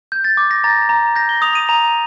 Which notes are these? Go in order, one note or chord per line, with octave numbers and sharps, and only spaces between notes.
G6
A6
D6
A#6
A#5 A6
A#5
G6 A#6
G7
D#6 F7
D#7
A#5 F7